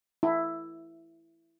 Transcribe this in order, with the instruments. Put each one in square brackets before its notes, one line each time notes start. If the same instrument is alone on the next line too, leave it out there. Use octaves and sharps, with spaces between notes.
[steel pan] E4